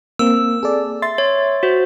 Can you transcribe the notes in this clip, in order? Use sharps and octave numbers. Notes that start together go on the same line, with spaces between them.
A#3 C4 E6
G#4 A4 D5
E5 C6 A6
C#5
F#4 C5